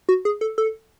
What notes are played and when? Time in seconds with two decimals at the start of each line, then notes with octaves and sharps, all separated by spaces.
0.09 F#4
0.25 G#4
0.41 A4
0.58 A4